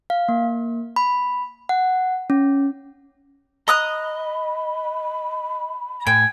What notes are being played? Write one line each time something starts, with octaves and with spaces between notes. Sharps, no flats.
F5
A#3
B5
F#5
C#4
D#5 A#5 B5 D#6 F#6
A2 G5 G#5